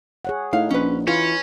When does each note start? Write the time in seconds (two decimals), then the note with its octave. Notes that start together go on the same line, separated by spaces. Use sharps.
0.25 G#4 C#5 F#5
0.53 A2 D#4 F5
0.71 A#1 C#4 B4
1.08 E3 C#4 F4 B4